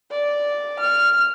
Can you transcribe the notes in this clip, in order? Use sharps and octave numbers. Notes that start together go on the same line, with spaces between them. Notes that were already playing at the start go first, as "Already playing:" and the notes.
D5
F6